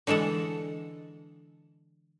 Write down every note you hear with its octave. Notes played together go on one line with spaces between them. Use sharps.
D3 E3 G#3 A4 F#5